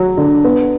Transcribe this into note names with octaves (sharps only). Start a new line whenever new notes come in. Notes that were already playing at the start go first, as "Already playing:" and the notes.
Already playing: F#3
D3
B3